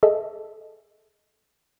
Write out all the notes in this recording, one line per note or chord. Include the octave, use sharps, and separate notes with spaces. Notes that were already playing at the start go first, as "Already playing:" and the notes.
G#4 A4 D#5 E5